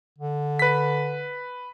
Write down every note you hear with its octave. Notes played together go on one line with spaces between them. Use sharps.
D3
B4 B6